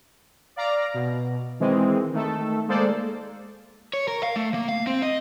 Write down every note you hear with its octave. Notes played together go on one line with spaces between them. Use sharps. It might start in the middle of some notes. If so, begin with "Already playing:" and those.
D5 F5 A#5
B2
D#3 E3 G#3 C4
D#3 A3 A4
G#3 A#3 A4 C5 D5
C#5
A#4
F5
A3
A#3
F5
C4
D#5